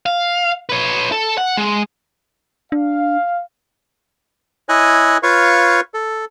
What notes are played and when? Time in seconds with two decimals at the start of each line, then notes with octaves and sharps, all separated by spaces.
0.06 F5
0.69 B4 C#5
1.12 A4
1.38 F#5
1.57 G#3
2.72 D4 F5
4.69 E4 C#5 D#5 G#5 F#6
5.23 F4 B4 C#5 F5 C#6
5.94 A4